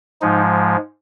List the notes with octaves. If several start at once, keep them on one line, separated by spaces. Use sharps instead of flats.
G#2 F3 G#3 D#4